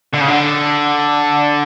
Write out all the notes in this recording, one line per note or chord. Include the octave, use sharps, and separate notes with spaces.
D3
C#3
D3